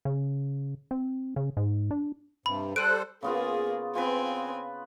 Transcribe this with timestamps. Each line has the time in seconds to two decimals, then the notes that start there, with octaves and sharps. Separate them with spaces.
0.05 C#3
0.91 C4
1.36 C#3
1.57 G#2
1.91 D4
2.46 G2 C3 B5
2.76 G3 A4 C5 F#6 D7 D#7
3.23 C#3 A#3 B3 F4 G#4
3.95 C4 F4 B4 G#5